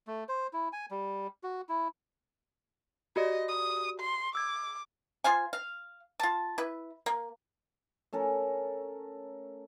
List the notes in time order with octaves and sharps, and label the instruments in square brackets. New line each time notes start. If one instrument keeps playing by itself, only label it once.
[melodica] A3
C5
E4
G#5
G3
F#4
E4
[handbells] F#4 G4 D5 [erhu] D#5
[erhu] D#6
C6
[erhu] D6 [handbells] E6 G#6
[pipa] F4 C5 F5 G#5
F5
F4 A5
E4 B4
A#3
[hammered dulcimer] A3 C#4 A4 A#4